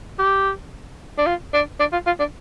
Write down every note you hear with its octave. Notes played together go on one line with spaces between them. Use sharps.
G4
D4
F4
D4
D4
F4
F4
D4